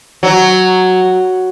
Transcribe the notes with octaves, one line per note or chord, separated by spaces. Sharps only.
F#3